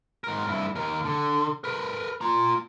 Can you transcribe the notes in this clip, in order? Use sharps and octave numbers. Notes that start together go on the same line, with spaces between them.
G#2 A#4
G2 E4
D#2 A#4
D3
A#4 B4
F4 A#5